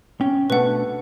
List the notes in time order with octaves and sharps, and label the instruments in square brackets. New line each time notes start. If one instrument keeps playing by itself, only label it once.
[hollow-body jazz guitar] C#4 G5
[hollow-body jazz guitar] B2 A3 D4 [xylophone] B4 F#5